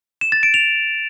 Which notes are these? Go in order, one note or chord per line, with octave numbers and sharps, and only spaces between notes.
E7
A6
D7
F7